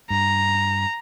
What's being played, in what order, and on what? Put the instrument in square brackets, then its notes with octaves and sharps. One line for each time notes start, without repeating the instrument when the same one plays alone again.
[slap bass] G2 [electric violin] A#5